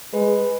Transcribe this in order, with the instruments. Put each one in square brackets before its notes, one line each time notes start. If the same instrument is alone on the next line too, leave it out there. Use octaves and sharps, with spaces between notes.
[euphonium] G#3 [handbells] B4